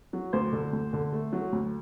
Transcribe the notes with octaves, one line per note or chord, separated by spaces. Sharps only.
F#3
D2 C5
D3
D2
D3
A3
F#3
D2